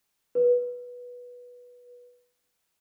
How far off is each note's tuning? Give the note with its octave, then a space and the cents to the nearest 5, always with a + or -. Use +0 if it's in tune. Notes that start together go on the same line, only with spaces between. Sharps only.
B4 -10